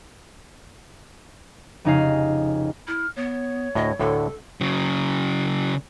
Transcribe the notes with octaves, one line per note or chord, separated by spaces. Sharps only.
F1 C#3 D#4 G#4 F5
E4 F6
B3 C#5
D2 A2 D#5
D2 A2 D3 A4
C#3 F#3